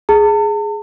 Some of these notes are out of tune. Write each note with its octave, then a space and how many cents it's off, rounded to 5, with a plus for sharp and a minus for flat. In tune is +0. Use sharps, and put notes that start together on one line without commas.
G#4 +0 A5 +40